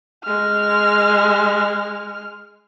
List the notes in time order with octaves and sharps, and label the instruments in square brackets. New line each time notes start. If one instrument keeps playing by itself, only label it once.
[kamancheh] G#3 F6